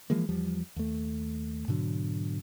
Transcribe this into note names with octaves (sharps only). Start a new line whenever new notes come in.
E3 F3 G#3 A#3
E2 F3 G3
D#2 A3
G#2 B2 D3 F#3